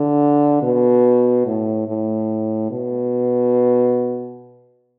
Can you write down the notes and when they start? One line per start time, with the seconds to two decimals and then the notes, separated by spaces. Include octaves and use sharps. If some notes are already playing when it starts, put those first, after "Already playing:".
Already playing: D3
0.63 B2
1.46 A2
1.88 A2
2.71 B2